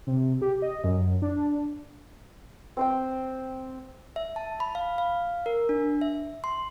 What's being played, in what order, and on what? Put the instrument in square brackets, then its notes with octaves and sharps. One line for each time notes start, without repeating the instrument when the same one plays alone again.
[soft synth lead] C3
G4
D#5
F#2
D4
[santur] C4 C5 G5
[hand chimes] E5
A5
B5
F5
F5
A#4
D4
E5
C6